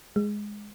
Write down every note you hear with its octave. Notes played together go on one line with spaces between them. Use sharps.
G#3